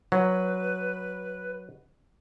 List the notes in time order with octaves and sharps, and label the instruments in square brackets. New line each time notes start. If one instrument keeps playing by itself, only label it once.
[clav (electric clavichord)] F#3 [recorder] B4